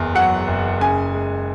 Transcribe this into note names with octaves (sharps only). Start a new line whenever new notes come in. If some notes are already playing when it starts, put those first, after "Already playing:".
Already playing: F#1 E2
F#3 F#5
F#1
C#3 G#5
G#3